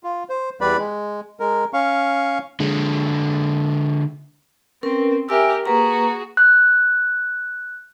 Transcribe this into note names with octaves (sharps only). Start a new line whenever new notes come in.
F4
C5
E2 G3 B4 D5 B5
G#3
G#3 A#4
C#4 F5 C#6
D3 G#3
C4 C#4 A#4 B4
G4 A#4 E5 G#5 E6
A#3 F#4 G#4 B4 A#5
F#6